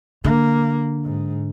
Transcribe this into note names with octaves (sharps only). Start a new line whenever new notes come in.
D3 A#3
G#2